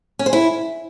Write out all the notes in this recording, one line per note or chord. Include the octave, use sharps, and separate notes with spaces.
C#4
C5
E4